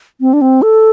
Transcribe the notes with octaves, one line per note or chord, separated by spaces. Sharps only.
C4
D4
C4
A4